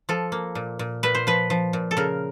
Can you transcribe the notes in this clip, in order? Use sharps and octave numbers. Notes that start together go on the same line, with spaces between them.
F3 A4
A#3
A#2
A#2
A#2 B4
C5
F3 B4
F3
A#2
A4
C#3 A#4